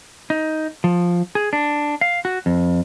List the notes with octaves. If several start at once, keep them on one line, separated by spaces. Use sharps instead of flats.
D#4
F3
G#4
D4
F5
F#4
F2